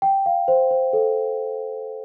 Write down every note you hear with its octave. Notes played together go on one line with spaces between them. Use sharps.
G5
F5
C5
C5
A4